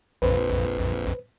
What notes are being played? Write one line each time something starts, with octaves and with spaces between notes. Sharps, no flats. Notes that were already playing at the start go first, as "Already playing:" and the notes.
A#1 F2 B4 C5